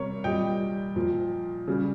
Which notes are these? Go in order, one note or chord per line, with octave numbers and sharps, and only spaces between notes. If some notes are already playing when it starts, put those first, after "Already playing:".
Already playing: C3 G3 A#4 C#5
A#2 G3 D#5 G5
A#2 F3
C#3 G3